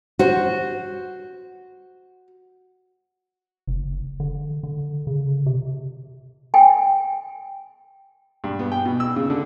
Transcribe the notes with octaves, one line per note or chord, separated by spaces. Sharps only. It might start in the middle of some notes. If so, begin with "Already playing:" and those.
F#4 C5
F#1
D3
D3
C#3
C3
G5 G#5
G2
B3
G5
B2
E6
C#3
D3